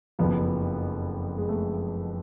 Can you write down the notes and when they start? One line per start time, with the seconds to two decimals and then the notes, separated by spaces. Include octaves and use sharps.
0.19 F#1 F2 F3 B3
1.38 G#3
1.48 A3